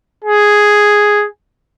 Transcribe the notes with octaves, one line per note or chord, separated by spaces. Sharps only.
G#4